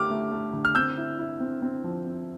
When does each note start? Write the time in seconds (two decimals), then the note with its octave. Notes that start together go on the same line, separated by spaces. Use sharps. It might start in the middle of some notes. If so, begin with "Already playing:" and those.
Already playing: D3 A3 G4 D6 F6
0.10 A3
0.32 A3
0.53 D3
0.65 F6
0.75 C4 E6 G6
0.97 E4
1.19 E4
1.40 C4
1.62 C4
1.84 F3
2.05 C4